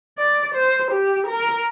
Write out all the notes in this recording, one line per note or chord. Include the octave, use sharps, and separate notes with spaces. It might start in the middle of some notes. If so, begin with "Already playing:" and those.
D5
C5
G4
A#4